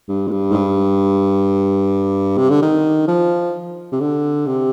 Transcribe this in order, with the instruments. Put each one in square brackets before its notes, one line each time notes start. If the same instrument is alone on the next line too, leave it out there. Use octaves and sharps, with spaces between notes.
[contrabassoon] G2
G#2
G2
G#2
G2
C3
D3
D#3
F3
C3
D3
C3